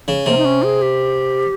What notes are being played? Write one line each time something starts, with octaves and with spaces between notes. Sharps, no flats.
C#3
C3 A#3
D#4
C#4
G#4
G4